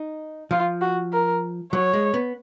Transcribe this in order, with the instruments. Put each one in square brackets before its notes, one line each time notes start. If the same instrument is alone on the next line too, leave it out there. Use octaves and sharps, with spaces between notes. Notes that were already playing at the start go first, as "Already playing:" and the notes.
Already playing: [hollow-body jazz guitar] D#4
[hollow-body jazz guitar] F3 [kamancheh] F4
[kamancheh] F#4
A#4
[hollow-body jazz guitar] F#3 [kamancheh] C#5
[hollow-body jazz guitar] G#3
B3